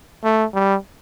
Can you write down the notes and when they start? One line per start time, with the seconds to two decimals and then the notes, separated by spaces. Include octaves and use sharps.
0.24 A3
0.54 G3